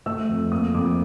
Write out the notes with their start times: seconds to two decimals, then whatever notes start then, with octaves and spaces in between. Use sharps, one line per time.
0.06 A3 E6
0.29 F2
0.52 A#3 D#6
0.74 F2 D6